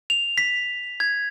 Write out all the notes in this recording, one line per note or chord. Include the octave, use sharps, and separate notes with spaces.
F7
B6
G#6